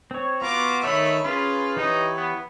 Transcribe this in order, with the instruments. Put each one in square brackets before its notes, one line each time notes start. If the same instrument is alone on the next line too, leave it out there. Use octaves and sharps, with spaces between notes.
[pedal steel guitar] C4 C#5
[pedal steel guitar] B3 F#4 [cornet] F4 [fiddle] A#5 D6
[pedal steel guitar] D#3 D#4 E5 [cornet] A3 [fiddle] C#5 B5
[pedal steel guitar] C#4 G#4 B5 [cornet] F4 [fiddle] B4
[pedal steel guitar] E3 G4 C#5 [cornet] D#4
[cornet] B3